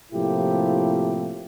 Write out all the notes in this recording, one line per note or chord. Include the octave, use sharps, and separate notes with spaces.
A2 C3 F3 A#3 E4 G4